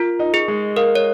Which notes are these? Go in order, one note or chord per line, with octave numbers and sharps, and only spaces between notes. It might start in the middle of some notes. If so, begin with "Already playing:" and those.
Already playing: F4 A#4
D#4
G#4
G#3
A#4 F5
C#5